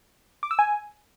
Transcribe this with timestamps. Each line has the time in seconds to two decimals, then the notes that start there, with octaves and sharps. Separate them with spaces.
0.43 D6
0.51 E6
0.59 G#5